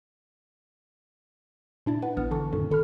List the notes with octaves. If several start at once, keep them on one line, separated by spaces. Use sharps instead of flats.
A#2 D4 E4 A6
B4 F#5
A1 B3 F6
D3 E3 A5 C#6
F#2 A#2 D3 D#3
G#1 A4 B5 F6